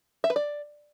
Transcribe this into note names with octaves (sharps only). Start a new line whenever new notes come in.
E5
B4
D5